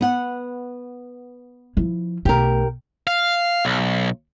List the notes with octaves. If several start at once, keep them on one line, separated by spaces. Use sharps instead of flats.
B3 F#5
F3 E4
B1 A3 G4 A#4
F5
B1